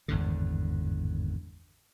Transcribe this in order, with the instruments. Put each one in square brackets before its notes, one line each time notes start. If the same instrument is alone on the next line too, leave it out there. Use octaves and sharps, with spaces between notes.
[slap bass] G#1 E2 G2 D3